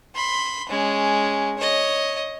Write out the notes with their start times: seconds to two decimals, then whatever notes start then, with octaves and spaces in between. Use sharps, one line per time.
0.15 B5 C6
0.69 G#3 C#4
1.58 C#5 D#5